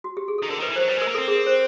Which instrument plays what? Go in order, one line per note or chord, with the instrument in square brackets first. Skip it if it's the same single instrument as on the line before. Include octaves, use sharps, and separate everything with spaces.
[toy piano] F#4
G4
G#4
[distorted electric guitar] D#3 [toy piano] A4
[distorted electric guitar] D3 [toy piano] A#4
[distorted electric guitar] D#3 [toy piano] B4
[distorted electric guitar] E3
[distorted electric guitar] F#3 [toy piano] C5
[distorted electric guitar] G3 [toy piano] B4
[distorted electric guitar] G#3 [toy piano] A#4
[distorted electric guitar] A#3
[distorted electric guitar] C4 [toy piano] A4
[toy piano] G#4
A#4
C5